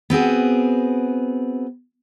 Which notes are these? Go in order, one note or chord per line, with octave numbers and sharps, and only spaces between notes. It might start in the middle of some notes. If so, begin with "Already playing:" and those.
B3 C4 F#4 G#4